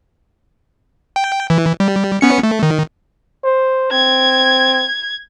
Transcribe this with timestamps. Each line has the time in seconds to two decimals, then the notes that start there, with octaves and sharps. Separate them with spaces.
1.16 G5
1.50 E3
1.80 G3
2.21 B3 C#4 C#7
2.43 A3
2.63 D#3
3.44 C5
3.92 C4 G#6